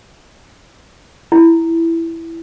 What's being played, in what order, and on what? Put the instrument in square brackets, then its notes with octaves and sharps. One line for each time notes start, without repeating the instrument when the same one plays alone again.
[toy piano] E4